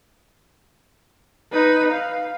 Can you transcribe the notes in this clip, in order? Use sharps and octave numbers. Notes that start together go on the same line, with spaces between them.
D#4 B4
F5